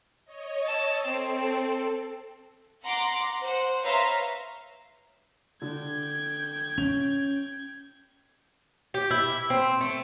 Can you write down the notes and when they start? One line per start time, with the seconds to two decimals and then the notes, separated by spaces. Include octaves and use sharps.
0.25 C#5 D#5
0.64 A5 E6
1.05 C4 A4
2.83 F#5 A#5 C6 D6
3.42 C5 F#5
3.82 B4 C#5 E5 F5 A#5 C6
5.62 D3 G5 G#6
6.78 C#4 F7
8.94 G4
9.11 E4
9.50 C4
9.81 A3